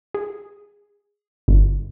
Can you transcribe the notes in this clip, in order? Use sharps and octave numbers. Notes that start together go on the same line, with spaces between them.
G#4
G1